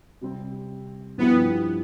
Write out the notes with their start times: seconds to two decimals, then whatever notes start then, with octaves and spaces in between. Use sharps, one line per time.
0.21 C3 G3 C4
1.18 G2 F3 B3 C4 E4 G4